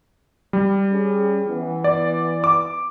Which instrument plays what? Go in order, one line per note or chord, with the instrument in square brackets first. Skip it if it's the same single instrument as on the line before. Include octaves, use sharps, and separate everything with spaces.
[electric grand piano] G3
[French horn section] C#4 G#4
E3 B3
[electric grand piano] D5
D6